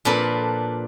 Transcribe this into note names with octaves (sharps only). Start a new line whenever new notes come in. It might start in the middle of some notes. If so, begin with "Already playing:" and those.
A#2 F3 D4 A4 B4